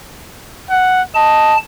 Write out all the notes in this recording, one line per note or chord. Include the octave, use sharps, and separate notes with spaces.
F#5
D#5 A5